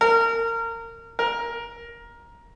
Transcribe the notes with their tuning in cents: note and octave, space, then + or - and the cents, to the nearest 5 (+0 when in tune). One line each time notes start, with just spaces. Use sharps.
A#4 -25
A#4 +15